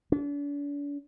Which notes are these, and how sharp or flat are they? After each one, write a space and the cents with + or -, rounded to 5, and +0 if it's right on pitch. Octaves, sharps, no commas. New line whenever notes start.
D4 -40